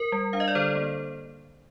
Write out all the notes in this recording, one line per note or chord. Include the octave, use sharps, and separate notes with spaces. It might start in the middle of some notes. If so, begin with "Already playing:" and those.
Already playing: A#4
G3
D4 F5
D#5
D5
D3 A4 C5
A#3